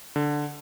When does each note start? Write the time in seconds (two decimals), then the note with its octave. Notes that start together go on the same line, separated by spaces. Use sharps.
0.16 D3